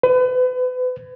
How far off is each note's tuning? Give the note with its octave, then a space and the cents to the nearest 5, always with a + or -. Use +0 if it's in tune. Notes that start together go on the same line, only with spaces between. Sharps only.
B4 +35